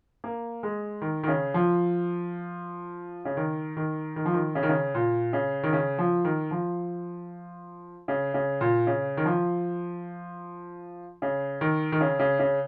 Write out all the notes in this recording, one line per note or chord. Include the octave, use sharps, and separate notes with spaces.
A#3
G#3
D#3
D#3
C#3
F3
C#3
D#3
D#3
D#3
F3
D#3
C#3
D#3
C#3
A#2
C#3
D#3
C#3
F3
D#3
F3
C#3
C#3
A#2
C#3
D#3
F3
C#3
D#3
D#3
C#3
C#3
C#3